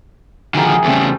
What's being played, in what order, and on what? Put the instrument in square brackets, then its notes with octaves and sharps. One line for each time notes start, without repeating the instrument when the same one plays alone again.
[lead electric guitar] D3 F3 [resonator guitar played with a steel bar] D#3 F#4 [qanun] G#4 E5 G#5
[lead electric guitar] E2 C#3 [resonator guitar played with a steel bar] G3 A3 C4